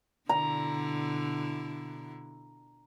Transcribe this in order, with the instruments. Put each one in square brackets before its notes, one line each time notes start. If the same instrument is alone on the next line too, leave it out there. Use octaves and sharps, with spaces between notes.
[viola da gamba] B2 D3 E4 [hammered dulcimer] A#5